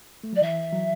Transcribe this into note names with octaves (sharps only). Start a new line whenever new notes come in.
A3
F#3 D5
E3 E5
F#3